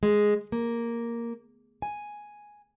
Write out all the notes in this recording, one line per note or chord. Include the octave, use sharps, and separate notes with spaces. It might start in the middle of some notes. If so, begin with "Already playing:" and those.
G#3
A#3
G#5